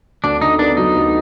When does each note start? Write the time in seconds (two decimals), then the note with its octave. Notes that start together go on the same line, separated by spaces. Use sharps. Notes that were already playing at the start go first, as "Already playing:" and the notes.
0.24 D2 D4
0.41 D3 D#4
0.59 B3 D4
0.77 F#3 D#4
0.96 D2